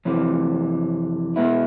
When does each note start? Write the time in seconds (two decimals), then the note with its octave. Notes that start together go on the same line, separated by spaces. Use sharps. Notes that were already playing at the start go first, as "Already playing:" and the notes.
0.05 F2 C3 E3
1.36 B2 G#3 B3 E4